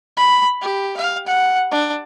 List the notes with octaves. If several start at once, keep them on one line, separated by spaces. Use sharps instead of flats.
B5
G4
F5
F#5
D4